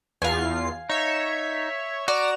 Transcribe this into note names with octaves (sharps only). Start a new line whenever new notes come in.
E2 F4 F5 G#5 C7
D#4 C#5 E5
F#4 D5 A#5 E7